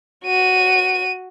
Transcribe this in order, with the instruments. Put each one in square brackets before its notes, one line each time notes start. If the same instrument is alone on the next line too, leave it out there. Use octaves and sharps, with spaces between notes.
[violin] F#4 D#7